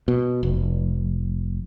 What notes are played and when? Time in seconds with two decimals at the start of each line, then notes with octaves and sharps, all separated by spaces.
0.08 B2
0.43 F1